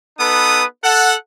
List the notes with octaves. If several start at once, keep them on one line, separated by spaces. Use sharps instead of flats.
B3 D#4 A4 B4 D#6
A4 F#5